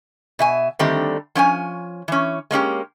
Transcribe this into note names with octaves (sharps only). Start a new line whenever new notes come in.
B2 E5 G#5
D3 D#3 G3 A3 C4 G4
F3 C#4 F#5 G#5
E3 C#4
G#3 A#3 C#4 G4